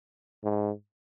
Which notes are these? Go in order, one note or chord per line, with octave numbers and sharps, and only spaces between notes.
G#2